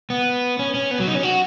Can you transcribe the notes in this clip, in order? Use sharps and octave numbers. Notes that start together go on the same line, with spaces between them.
B3
C#4
C#4
B3
F#3
D#4
C#4
F#4